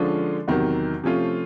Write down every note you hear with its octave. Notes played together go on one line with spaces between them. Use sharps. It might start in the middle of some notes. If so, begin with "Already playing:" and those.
Already playing: D3 F3 G#3 C#4 F4
E2 C3 D#3 F#3
C3 F3 A3 C#4 F4